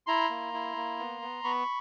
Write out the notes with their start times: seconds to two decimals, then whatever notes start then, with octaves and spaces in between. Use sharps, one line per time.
0.07 E4 A#5 C6
0.30 A#3
0.54 E4
0.76 A#3
0.99 B3
1.22 B3
1.44 B3 B5 C#6